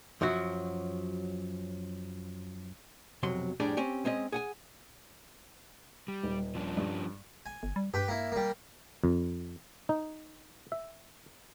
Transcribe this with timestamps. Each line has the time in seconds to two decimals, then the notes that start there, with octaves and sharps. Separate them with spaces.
0.21 F#2 F3 F#3 F#4
3.23 B1 F2 C3 F#3 C6
3.60 F2 A2 G3 D4 G#4 D5
3.77 C4 C#4 G4
4.05 G#3 C4 C#4 D#5
4.32 G#4 F#5 G#5
6.08 G3
6.23 D#1
6.55 F3 C#4 D4
6.77 G2
7.46 G#5
7.63 G1
7.76 G3
7.94 G2 G4 B4
8.08 A#3 E4
8.32 G3 A#3
9.04 F2
9.89 D#4
10.72 E5